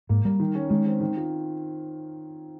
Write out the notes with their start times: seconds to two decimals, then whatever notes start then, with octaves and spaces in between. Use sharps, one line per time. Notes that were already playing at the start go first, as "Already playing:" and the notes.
0.09 G#2 A#3
0.25 G3 A#4
0.40 D#3
0.55 C#4
0.70 D#3 G#3
0.86 C4
1.00 D#3
1.17 F4